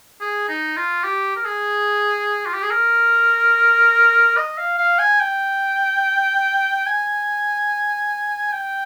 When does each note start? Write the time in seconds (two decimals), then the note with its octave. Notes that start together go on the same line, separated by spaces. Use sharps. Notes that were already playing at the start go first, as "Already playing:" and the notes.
0.21 G#4
0.49 D#4
0.77 F4
1.04 G4
1.36 A#4
1.45 G#4
2.46 F4
2.54 G4
2.62 G#4
2.71 A#4
4.37 D#5
4.58 F5
4.78 F5
4.99 G#5
5.20 G5
6.87 G#5
8.53 G5